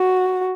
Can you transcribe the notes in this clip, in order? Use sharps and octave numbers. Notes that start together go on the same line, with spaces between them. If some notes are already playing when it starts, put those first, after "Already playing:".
Already playing: F#4